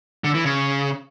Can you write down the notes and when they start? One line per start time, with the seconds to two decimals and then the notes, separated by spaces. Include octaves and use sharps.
0.24 D3
0.34 E3
0.45 C#3